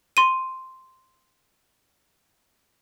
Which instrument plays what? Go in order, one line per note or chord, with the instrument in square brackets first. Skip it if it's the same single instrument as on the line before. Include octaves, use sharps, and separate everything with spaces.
[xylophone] C6 D#7